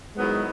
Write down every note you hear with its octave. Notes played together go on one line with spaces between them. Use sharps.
G#2 D#3 F#3 G#3 B3 E4